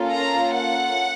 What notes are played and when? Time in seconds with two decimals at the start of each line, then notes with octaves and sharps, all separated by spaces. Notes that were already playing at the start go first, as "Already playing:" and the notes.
Already playing: A#3 C#4 F4 A4
0.12 A#5
0.53 F#5